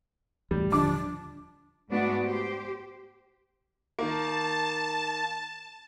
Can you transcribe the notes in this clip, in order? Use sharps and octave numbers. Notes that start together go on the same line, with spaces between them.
E2 A2 G3
D#1 D3 F3 D4 D6
G#2 A3 B3 D4 F#4
G4 C5
D#3 A#3 A5